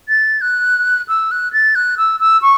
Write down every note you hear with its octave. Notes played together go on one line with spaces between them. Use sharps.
A6
F#6
E6
F#6
A6
F#6
E6
E6
C#6